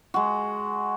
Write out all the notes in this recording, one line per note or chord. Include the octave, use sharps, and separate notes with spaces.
G#3 F#4